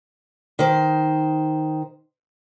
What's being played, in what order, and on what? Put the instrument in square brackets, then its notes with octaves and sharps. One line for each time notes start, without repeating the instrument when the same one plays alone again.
[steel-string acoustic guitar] D#3 C5